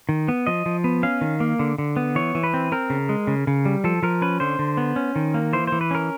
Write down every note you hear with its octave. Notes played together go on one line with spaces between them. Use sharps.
D#3
B3
F3 D#5
F3
B3
C#4 F5
D#3
A#3
D3
D3
B3
E3 C#5
E3
B4
C4
C4 A#4
C#3
G#3
C#3
C#3
G3
F3 A4
F3 A#4
C#4 B4
D3 C5
D3
B3
C#4
D#3
A#3
E3 C5
E3 C5
B4
C#4 A#4